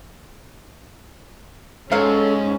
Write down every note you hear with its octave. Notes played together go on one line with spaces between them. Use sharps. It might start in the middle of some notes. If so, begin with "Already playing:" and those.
G#2 F#3 C#4 A4 F5